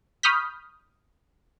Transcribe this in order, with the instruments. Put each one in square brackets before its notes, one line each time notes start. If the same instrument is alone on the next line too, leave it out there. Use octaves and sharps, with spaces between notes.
[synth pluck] B5 C#6 D#6 F6 G6 B6